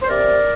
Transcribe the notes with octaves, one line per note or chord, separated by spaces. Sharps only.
C5
C3 A#4 D5